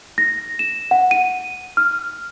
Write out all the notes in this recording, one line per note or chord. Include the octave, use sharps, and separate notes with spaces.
A#6
E7
F#5
D#7
F6